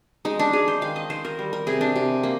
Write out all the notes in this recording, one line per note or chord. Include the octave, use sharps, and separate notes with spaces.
G#3 D#4
D4
G#3 G#4
C5
D#3 F5
D#5
D#3 C5
A#4
G3
A#4
C3 G#4
D4
C3
A#3